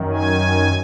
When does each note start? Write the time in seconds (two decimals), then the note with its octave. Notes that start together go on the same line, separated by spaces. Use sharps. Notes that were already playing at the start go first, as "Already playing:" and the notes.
Already playing: F#2 D#3
0.12 G#5